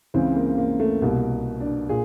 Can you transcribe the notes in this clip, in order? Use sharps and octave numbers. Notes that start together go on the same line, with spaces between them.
C#2 C#3 E3 C4
A#3
A#3
A3
C2 B2 A#3
D4
A#2 G#4